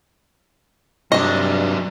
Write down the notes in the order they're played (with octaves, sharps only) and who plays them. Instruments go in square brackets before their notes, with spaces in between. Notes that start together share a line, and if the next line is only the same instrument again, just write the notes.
[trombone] G2 [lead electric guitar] C3 F#3 [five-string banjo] D4 D#5